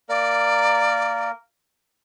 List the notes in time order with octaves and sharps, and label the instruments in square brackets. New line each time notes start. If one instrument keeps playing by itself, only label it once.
[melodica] A#3 A#4 [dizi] D5